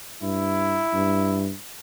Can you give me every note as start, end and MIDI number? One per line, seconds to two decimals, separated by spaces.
0.22 0.81 43
0.22 1.51 64
0.93 1.51 43